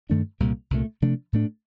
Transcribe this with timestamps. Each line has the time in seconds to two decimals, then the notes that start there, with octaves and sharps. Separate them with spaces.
0.10 G2 D#3 A3 D4
0.40 C2 A#2 G3 A#3
0.71 C2 A#2 A3
1.02 C3 F3 A3 D4
1.33 A2 A3 D4